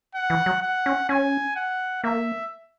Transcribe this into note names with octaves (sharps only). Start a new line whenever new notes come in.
F#5
E3
F#3
F#5
C#4
C#4 G#5
F#5
A#3 E5